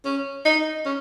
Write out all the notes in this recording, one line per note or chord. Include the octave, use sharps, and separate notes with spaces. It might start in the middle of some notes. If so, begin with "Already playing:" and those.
C#4
D#4
C#4